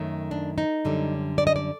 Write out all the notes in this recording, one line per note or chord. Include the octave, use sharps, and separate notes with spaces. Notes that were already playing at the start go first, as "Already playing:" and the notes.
Already playing: F#2 D#3 A3
D4
D#4
F#2 D3 G3
D5
D#5
D5